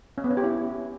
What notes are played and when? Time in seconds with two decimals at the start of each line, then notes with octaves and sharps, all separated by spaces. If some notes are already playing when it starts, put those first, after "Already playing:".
0.18 C#4
0.24 B3
0.31 C#4
0.37 G4
0.44 E4